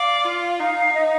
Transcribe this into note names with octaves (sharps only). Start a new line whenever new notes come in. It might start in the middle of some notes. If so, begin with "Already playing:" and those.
Already playing: D5 F5
F4
D#4 F5
D#5